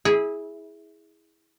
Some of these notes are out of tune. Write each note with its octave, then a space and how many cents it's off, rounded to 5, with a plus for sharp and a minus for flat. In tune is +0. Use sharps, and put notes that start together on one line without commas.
E4 -20 G#4 +0